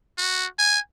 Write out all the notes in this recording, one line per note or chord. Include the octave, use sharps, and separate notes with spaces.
F#4
G#5